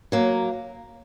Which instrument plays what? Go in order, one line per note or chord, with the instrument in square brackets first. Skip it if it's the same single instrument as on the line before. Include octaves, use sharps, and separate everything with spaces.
[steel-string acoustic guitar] F#3 A#3